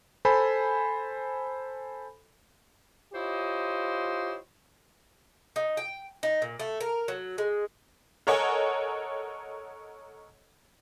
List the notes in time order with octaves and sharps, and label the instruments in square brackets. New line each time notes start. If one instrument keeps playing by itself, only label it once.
[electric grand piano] A4 C5 G#5 B5
[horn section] E4 F4 G4 C5 C#5 D#5
[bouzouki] D#4
G5
D#4
A#2
A3
A#4
F#3
G#3
[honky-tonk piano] A4 A#4 C#5 D#5 F#5 G#5